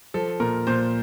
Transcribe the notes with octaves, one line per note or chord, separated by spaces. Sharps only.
F3 A4
A#2 A#4
A#2 C5